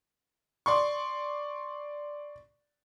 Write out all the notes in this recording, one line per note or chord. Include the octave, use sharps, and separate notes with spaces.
D5 C6 C#6